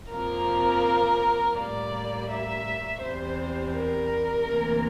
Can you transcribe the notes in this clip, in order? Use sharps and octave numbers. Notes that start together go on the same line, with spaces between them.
F2 C3 F3 A#3 A#4
A2 G3 A#3 D5
E5
E2 C3 G3 C5
A#4
D2 C3 E3 A#3